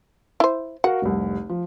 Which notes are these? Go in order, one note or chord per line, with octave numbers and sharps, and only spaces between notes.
E4 C5
F#4 A#4 F5 F#5
F1 C2
F3